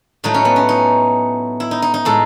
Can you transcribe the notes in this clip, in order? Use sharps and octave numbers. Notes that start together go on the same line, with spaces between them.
A2 F#3 A3 D#4
C#4
B3
C#4
D#4
E4
D#4
D#4
D#4
A2 G#3 A4